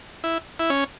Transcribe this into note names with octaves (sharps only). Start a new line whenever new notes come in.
E4
E4
C#4